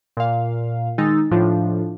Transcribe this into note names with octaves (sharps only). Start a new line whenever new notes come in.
A#2 F5
D#3 G#3 D#4 E6 A6
A2 F3 D4 F4